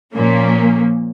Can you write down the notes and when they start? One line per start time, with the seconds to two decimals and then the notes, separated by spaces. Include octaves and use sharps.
0.14 A#2 F3 A#3 C#4